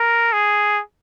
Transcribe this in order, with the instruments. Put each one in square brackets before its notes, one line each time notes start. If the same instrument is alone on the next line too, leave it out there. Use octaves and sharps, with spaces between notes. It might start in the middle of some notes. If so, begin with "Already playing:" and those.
Already playing: [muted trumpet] A#4
G#4